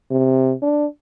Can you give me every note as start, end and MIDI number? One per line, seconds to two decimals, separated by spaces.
0.11 0.53 48
0.62 0.86 62